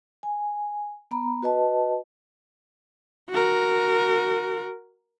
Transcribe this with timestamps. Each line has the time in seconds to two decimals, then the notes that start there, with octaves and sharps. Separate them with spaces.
0.23 G#5
1.11 B3 A#5 B5
1.43 F#4 B4 D#5 A5
3.30 F#4 A#4